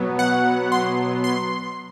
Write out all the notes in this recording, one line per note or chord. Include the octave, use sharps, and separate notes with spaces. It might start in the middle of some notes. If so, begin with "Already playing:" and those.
Already playing: B2 F#3 B3
F#5
C6
C6